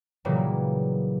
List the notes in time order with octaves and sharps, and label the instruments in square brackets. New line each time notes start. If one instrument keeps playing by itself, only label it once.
[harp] A#2 C#3 E3 F#3 G3 A#3